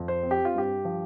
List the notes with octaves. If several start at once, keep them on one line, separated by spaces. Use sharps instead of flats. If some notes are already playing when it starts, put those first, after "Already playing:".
Already playing: F2
C5
C4
G4
F4
G2 G4
F3